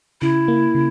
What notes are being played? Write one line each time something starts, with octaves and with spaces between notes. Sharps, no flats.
C#3 E4
A#3
C#3